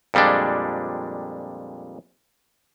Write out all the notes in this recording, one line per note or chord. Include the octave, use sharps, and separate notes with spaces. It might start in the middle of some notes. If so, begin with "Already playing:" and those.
F2 A#2 G3 G#3 D4